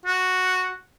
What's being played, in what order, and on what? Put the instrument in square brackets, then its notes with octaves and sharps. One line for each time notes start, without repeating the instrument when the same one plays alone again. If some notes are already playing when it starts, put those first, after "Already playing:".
[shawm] F#4